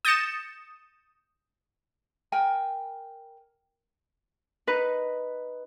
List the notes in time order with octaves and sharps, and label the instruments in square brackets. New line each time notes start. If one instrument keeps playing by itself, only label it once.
[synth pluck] D#6 G6 A6 A#6 C#7 E7
[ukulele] A#4 G5 G#5
[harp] D#4 B4